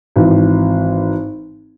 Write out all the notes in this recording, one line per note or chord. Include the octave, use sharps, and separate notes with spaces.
G#1 E3